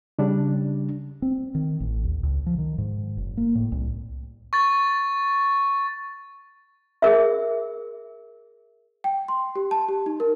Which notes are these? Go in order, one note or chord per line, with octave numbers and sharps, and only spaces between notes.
C#3 G3 D4
C4
D#3
A1
D#2
C#2
F3
D#3
G#2
F#1
A#3
A2
C2
C#6 A6
G#4 A#4 E5
G5
C6
G4
A5
G4
D#4
A#4